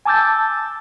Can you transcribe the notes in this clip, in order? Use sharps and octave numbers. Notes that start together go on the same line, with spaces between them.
G#5 A5 D6 E6 G6 A6